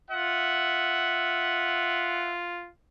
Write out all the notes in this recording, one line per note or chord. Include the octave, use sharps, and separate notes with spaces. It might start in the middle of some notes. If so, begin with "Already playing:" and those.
F4 E5 F#5